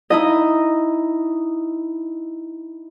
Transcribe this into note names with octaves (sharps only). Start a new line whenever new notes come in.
D#4 E4 D#5